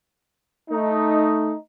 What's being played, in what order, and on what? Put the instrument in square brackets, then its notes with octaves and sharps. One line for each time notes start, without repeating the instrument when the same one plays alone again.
[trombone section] A3 D#4